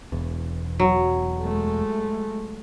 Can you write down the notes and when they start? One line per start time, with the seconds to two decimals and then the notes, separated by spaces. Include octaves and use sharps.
0.12 E1 E2
0.80 F#3
1.41 G#3 A3